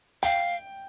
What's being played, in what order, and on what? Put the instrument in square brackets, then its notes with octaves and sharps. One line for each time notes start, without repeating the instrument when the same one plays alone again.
[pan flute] F5 [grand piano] G5